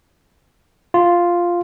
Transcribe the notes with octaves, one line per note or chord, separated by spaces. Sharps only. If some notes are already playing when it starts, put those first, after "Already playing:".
F4